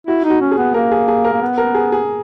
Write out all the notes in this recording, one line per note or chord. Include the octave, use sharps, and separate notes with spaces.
E4 F#4
D#4
F#4
C#4
G#4
B3
A#3 A#4
G#4
G#4
A#4
A#3
B3
A#4
G#4
G#4